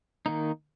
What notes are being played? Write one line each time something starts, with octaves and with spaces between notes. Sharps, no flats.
D#3 A#3 D#4